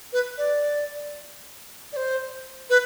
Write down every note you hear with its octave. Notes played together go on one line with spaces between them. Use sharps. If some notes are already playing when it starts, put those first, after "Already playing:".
B4
D5
D5
C5
B4